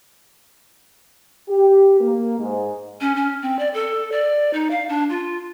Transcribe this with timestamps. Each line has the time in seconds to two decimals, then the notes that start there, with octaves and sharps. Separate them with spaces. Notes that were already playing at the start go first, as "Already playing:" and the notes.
1.49 G4
2.01 A#3
2.39 G#2
3.01 C#4
3.15 C#4
3.42 C4
3.59 D5
3.74 A4
4.12 D5
4.53 D#4
4.70 F5
4.89 D4
5.09 F4